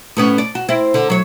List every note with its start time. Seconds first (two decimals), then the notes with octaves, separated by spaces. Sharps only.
0.17 A2 B3 C#4
0.38 D5
0.55 F#4
0.69 C4 E4
0.94 D3
1.10 F#3 C#5